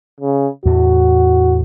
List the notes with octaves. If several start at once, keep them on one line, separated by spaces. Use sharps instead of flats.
C#3
E2 A2 F#4